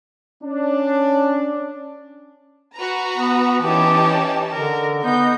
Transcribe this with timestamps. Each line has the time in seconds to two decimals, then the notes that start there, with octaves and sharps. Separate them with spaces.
0.43 C#4 D4
2.75 F#4 B4 A#5
3.16 B3
3.62 E3 C#4 D#4 G4 A5
4.52 D3 A#4
5.04 B3 D#4 G6